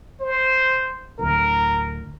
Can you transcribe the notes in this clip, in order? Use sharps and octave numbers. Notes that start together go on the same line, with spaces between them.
C5
D1 D2 A#4